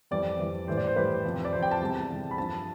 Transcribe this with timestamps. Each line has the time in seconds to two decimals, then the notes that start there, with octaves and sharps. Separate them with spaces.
0.11 F2 E3 G3 D5
0.39 F2 E3 G3
0.67 A2 E3 G3 C5
0.77 D5
0.87 C5
0.96 A2 E3 G3 B4
1.25 F2 C3 F3
1.45 D5
1.52 F2 C3 F3 C5
1.63 G5
1.71 A5
1.81 E2 C3 G3
2.09 E2 C3 G3
2.31 B5
2.37 G2 F3 A5